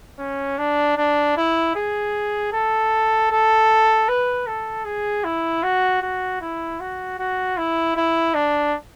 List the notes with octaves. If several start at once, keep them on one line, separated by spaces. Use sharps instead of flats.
C#4
D4
D4
E4
G#4
A4
A4
B4
A4
G#4
E4
F#4
F#4
E4
F#4
F#4
E4
E4
D4